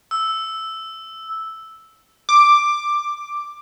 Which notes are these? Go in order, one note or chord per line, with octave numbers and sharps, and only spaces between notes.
E6
D6